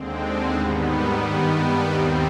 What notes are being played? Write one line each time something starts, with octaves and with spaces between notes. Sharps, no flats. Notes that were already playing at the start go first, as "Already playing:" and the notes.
Already playing: D#2 D3 G#3 C4
C4
G#2 D#3 G3 B3
G2 D#3 G3
D#2 D#3 G3 C4